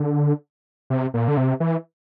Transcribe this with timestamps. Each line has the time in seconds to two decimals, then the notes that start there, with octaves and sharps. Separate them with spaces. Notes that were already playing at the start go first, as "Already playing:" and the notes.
Already playing: D3
0.90 C3
1.14 A#2
1.28 D3
1.37 C3
1.60 E3